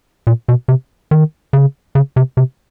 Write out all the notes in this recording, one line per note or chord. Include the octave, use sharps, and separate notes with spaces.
A#2
B2
C3
D#3
C#3
C#3
C3
C3